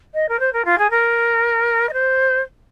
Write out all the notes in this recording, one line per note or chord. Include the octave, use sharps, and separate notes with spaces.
D#5
A#4
C5
A#4
F4
G#4
A#4
D#5
C5